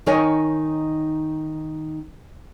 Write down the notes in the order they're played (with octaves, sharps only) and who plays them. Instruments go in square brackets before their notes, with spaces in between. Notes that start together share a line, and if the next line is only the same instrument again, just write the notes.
[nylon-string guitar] D#3 D#4 A#4 C#5 D#5 G#5